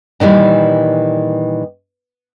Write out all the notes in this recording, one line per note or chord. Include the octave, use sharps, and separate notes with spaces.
A#2 D#3 E3 G3